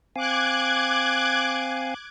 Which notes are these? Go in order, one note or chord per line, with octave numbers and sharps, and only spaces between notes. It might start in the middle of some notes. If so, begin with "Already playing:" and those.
C4 F5 G#5 D6 F#6 G#6